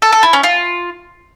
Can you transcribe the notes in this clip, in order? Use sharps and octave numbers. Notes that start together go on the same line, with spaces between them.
A4
A4
E4
C#4
F4